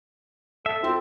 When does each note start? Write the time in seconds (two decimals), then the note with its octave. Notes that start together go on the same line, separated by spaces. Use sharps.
0.66 A4 E5
0.83 C4 E4 F4 A4